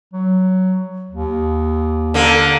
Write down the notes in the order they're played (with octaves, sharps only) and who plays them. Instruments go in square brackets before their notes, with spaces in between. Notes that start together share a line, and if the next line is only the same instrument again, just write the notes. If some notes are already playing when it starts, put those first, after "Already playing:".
[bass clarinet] F#3
D#2
[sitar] D3 A#3